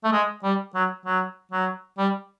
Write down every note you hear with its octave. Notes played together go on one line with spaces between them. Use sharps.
A3
G#3
G3
F#3
F#3
F#3
G3